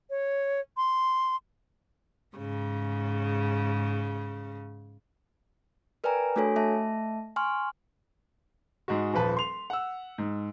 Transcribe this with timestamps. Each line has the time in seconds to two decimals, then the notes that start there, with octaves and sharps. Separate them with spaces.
0.10 C#5
0.77 C6
2.36 G#2 C#3
6.04 A#4 B4 D5 G5 G#5 A#5
6.36 A3 D4 F#4 A4 C#5 G#5
6.56 A3 E5 A5
7.36 G#5 C6 C#6 F6
8.88 G#2 G#3 F#4
9.14 D#1 F3 B4 A5
9.37 C6 F7
9.70 F#5 E6
10.18 G#2